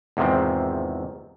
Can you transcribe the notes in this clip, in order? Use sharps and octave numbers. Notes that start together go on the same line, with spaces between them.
E2 G#2 C3 D#3 F3 C4